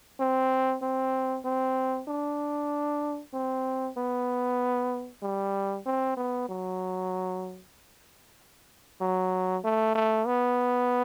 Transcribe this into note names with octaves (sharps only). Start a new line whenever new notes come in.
C4
C4
C4
D4
C4
B3
G3
C4
B3
F#3
F#3
A3
A3
B3